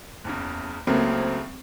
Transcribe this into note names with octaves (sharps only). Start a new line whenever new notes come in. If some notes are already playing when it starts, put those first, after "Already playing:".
F#1 E2 C#3
C#2 C#3 F#3 A3 A#3 C4